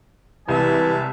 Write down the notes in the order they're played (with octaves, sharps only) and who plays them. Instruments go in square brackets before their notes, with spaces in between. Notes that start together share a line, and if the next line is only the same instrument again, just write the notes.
[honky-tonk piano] C2 [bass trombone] E3 [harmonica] G#3 E5 A5